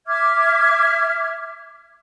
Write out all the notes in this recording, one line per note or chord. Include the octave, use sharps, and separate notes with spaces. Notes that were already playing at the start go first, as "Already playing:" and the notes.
E5 D6 F6 G#6